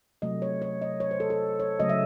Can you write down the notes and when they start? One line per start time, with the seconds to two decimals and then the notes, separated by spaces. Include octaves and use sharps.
0.22 C3 F#3 A3 D#5
0.42 C#5
0.62 C#5
0.82 D#5
1.00 C#5
1.11 C5
1.20 A4
1.30 A4
1.60 C#5
1.80 C#3 F#3 A3 D#5
1.90 E5